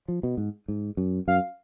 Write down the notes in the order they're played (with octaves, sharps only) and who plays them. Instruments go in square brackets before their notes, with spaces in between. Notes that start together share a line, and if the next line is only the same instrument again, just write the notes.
[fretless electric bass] F3
B2
G#2
G#2
F#2
[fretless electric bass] F#2 [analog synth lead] F5